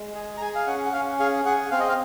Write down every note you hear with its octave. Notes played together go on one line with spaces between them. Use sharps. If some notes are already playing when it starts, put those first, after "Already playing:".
Already playing: G#3
G#4
A#5
G#4 G#5
F5
C#4 F#5
F#5
C#4 F5
G#4 F5
G#4 F#5
C4 F5
D#5
F5